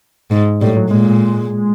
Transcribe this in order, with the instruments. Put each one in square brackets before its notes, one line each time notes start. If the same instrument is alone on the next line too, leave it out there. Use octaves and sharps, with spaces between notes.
[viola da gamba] G#2
[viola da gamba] A2 [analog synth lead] G3
[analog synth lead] F#3
[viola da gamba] A#2 [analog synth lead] G#3